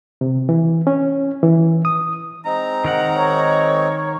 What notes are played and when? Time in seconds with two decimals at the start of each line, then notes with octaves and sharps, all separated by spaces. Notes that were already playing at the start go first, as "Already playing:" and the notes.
0.21 C3
0.49 E3
0.87 C#4
1.43 E3
1.85 D#6
2.45 G#3 C4 D#4 A#5
2.85 D#3 A#4 F#5
3.14 C#5